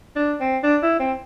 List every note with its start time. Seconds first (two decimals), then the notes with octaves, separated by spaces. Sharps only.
0.15 D4
0.40 C4
0.63 D4
0.82 E4
0.99 C4